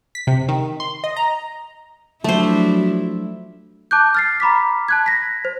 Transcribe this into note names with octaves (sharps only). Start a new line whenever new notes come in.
B6
C3
D#3
C6
D#5
A#5
F3 F#3 A3 D4 E4 C5
A5 D6 F#6 G6
F6 A6 C7
A#5 B5 D6 B6
A5 F#6 G#6
A#6 B6
C5